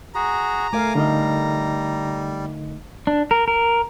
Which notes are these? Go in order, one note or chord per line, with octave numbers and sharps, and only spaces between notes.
F#4 G#4 A#5
A3 A#4 F5 G#5 D6
D3 G3 D#4 D#5
D4
A#4
A#4